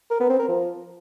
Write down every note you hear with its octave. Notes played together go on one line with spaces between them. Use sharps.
A#4
B3
C4
A#4
F3